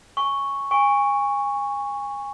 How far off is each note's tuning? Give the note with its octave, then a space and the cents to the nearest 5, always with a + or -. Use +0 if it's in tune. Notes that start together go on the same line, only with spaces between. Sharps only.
G#5 +0 C#6 +0
G#5 -30 C#6 +0